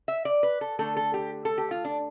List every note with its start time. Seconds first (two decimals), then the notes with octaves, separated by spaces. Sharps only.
0.08 E5
0.25 D5
0.43 B4
0.61 A4
0.79 D3 A3 A4
0.97 A4
1.14 G4
1.45 A4
1.58 G4
1.71 F4
1.85 D4